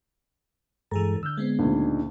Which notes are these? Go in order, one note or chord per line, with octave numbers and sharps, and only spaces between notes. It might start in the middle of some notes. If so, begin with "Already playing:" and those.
G2 E3 G#3 G#4 A4 A#5
D3 E6 F6 G6
G#3 B3 C4
D2 A#2 C#3 D4 D#4